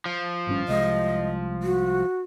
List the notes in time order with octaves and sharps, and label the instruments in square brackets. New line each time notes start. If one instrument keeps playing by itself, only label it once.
[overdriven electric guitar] F3
[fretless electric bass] G#1 G2 C#4
[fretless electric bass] C2 G#3 [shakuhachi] D#5
[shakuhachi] F#4